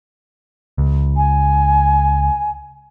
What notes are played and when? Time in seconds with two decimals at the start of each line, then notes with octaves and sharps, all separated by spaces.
0.78 C#2
1.17 G#5